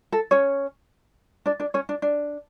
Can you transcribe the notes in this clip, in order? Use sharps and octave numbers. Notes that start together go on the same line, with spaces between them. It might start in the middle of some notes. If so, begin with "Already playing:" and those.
A4
C#4 C#5
D4 D5
D4 D5
C#4 C#5
D4
D4